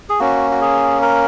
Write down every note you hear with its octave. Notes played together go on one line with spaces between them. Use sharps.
G#4
A#3 C#4 F#4
F#4
G#4
A#4